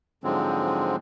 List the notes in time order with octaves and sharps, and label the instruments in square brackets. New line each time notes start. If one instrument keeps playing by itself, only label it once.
[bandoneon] G#2 D3 F3 F#3 G#3 C4